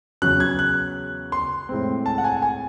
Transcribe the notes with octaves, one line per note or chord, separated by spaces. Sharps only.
E2 C#3 F#3 C#4 F#6
G#6
F#6
C6
A2 G#3 C4
A5
F#5
G#5
G#5